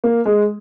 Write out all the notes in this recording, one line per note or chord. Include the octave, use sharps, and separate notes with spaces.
A#3
G#3